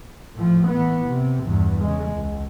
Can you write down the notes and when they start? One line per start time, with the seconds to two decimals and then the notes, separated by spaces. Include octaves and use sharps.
0.35 A2 F3
0.68 E3 B3
1.06 C3
1.44 E2 G2
1.82 C#3 G#3
2.13 C#2